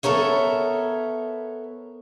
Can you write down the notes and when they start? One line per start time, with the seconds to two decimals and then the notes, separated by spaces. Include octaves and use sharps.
0.03 B3 A4 A#4 C#5 E5